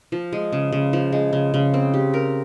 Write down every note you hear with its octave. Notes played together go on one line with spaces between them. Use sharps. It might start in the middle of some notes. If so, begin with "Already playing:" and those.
F3
G#3
C#3
C#3
F3
G#3
C#3
C#3
C4
G4
A#4